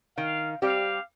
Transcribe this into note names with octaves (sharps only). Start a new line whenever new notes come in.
D#3 F5
G3 C4 G4 F5